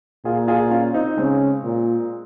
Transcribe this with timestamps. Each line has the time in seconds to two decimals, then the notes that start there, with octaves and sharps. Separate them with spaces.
0.25 A#2 F4 G#4
0.48 F4 G#4
0.71 C#4 F4
0.94 C4 D#4
1.17 C#3 G#3 C4
1.63 A#2